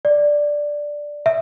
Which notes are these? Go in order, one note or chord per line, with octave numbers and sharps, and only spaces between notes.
D5
E5